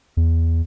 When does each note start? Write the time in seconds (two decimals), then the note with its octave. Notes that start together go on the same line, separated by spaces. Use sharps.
0.17 E2